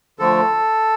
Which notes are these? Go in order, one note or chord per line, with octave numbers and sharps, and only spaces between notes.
D3 F3 A3 A4